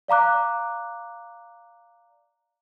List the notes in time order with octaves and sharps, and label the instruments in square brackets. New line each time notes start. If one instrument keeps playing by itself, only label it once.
[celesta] D5 F5 A#5 D6 F#6